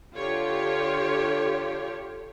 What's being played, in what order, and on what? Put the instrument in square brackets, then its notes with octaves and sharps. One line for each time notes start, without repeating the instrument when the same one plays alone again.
[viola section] D3 F4 G4 C#5